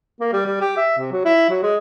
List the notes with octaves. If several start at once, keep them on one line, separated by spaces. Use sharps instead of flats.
A#3
G3
G3
G4
E5
C3
F#3
E4
F#3
G#3